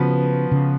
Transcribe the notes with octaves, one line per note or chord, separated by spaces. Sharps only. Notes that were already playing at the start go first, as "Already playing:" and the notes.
Already playing: C#3 F3 B3 F#4 B4
C#3